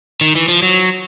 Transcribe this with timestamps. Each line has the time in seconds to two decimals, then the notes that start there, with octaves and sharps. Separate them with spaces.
0.21 D#3
0.35 E3
0.48 F3
0.62 F#3